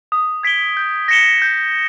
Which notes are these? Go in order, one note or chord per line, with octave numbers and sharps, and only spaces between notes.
D#6
G#6 B6 D7 G7
G6
A#6 C#7 E7 G7
G6